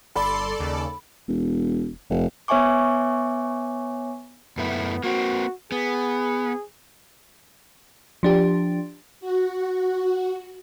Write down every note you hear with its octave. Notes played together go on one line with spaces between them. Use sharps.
G1 A4 D5 B5 C6
D#2 C#3
E1
F1
B3 C#5 E5 G#5 C#6 D6
F#2 A3 B3 E4
A#3 C4 F#4
B3 G#4
F3 D4 G4
F#4